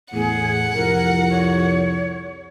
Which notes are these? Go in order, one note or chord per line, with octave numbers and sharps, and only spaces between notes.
E2 A2 G#4 F#5
C2 F2 A#4
C#5